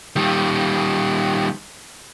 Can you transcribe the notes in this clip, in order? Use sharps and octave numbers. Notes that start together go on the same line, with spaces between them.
D#3 G3